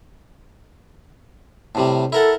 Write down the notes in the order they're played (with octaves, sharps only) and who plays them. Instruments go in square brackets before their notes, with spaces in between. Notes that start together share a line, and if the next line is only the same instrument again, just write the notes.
[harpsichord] A2 C3 G3
[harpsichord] E4 A#4 F#5 [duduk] A4